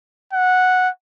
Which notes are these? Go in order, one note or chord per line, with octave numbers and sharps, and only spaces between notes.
F#5